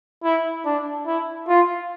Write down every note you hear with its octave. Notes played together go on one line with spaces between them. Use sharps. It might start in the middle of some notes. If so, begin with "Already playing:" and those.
E4
D4
E4
F4